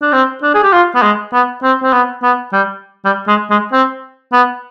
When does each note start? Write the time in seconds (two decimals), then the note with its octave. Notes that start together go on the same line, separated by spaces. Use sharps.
0.02 D4
0.13 C4
0.43 D4
0.54 G#4
0.63 G4
0.73 F4
0.95 B3
1.03 G#3
1.33 B3
1.63 C4
1.83 C4
1.93 B3
2.23 B3
2.53 G3
3.05 G3
3.28 G#3
3.50 G#3
3.73 C4
4.33 B3